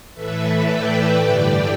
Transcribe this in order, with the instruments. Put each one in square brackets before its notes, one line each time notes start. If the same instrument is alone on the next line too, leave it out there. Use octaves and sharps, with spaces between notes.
[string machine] A2 E3 A3 B4 E5
D5 G5
G2 D3 G3 D5 G5